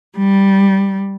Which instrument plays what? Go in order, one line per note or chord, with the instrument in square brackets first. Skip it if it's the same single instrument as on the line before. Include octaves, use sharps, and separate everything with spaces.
[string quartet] G3